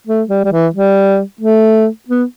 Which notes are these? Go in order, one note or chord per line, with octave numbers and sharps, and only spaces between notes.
A3
G3
G3
E3
G3
A3
B3